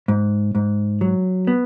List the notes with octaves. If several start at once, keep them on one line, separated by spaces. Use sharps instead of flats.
G#2
G#2
F#3
B3